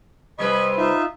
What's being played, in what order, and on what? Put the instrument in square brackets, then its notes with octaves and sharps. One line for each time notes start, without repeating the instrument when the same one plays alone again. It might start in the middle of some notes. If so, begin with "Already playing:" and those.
[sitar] C3 G3 B4 [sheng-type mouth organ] D#5 B5 C#6
[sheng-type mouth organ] D#4 F4 E5